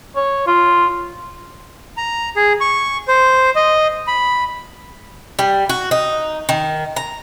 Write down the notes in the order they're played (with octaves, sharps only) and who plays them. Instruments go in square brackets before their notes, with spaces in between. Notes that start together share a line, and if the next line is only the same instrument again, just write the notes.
[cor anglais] C#5
F4
[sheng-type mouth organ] A#5
G#4
C#6
C5
D#5
B5
[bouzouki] G3
F#4
D#4
D#3
A#5